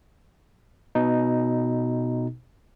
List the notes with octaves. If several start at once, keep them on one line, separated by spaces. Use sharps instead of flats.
B2 D#4